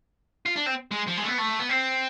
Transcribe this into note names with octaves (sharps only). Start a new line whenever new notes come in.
F4
D4
C4
G#3
F3
G#3
A3
B3
A3
B3
C4